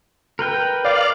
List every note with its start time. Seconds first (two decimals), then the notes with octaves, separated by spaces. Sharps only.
0.39 A#4 B4 G5
0.85 D5 F5